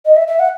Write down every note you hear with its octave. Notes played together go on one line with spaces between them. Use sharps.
D#5
E5
E5
F#5